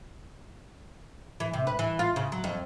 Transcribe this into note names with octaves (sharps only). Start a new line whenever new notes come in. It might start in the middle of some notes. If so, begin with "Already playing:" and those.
E3
C3
B4
E3
F4
C#3
F#3
F2